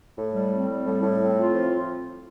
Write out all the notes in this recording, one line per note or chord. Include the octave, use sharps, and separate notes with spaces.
A2
G3
C4
G3
A2
A2
C4
F4
F3